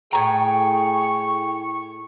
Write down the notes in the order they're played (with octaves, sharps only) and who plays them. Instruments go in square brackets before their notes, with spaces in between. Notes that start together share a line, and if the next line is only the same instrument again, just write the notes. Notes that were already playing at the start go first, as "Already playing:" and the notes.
[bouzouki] A2 A#5 [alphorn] G#4 [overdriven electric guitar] G5 [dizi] C#6